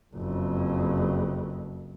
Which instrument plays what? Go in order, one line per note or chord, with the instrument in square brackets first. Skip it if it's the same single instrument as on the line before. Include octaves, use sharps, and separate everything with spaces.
[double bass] F#1 F2